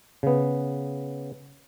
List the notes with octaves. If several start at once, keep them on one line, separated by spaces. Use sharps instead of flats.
C#3 B3